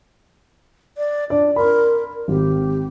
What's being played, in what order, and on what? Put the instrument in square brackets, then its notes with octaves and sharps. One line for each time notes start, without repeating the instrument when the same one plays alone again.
[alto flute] D5
[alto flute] D4 [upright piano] D5
[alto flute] A#4 [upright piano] B5 C6
[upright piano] G#1 [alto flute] G4